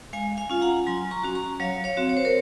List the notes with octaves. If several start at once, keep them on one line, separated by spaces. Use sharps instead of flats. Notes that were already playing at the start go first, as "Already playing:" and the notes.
G#3 F5 G#5
F5 G#5
C#4 F4
F#5 A#5
F#3 G#5 C6
A#5 C#6
C#4 F#4
A#5 C#6
F#3 C#5 F5
C#5 F5
C4 F#4
C#5
C5
A#4 C#5